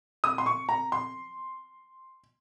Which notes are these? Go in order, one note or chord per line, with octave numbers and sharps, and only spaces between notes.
D#6
C6
C#6
A#5
C6